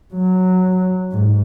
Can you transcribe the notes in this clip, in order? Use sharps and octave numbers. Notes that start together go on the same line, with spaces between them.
F#3
G#2